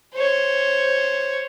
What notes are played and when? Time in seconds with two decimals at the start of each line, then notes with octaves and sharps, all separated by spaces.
0.14 C5 C#5